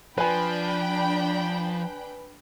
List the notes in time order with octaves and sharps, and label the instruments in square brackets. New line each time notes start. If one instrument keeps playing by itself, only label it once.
[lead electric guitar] F3 [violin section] D4 G5 B5 [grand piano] B4 G#5